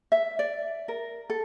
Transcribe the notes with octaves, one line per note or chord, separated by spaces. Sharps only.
E5
D5
A#4
A4